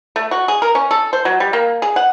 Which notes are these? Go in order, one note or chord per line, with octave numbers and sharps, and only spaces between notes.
A3
F#4
G#4
A#4
C#4
A4
C5
F#3
G3
A#3
G#4
F#5